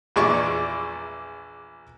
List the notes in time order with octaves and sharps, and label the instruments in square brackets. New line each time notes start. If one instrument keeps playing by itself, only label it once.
[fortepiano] A#1 E2 G#3 D5 C#6